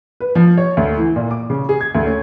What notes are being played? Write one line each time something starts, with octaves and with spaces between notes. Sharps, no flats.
B4
F3
C#5
D2
E3
A#2
D6
C#3
G#4
G#6
D2
C#4